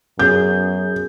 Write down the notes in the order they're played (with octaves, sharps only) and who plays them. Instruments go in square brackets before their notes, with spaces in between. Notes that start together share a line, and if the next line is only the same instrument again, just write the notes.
[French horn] F#2 [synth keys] B3 C#4 G#4 [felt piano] G6